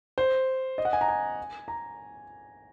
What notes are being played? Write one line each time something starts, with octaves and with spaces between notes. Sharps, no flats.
C5
D#5
F#5
G#5
A#5
G#5
A#5